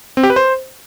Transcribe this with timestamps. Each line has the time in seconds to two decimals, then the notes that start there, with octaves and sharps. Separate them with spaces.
0.17 C4
0.23 G4
0.30 B4
0.36 C5